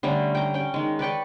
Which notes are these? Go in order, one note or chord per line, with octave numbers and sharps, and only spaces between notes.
D3 G3 A3 C#4
G5 A#5
C#4 G5
D#3 G#3
B4 D5 G5 C#6